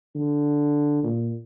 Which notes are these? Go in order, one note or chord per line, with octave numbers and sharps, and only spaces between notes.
D3
A#2